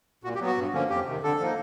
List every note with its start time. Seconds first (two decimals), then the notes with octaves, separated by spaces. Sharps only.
0.24 A#2 F#4
0.35 G4
0.40 F#3 B3
0.46 F#4
0.57 G2
0.73 D3 F3 A#3 C#4
0.90 F2 G4
1.06 C3 D#3
1.23 D3 A4
1.40 F3 A#3 D#4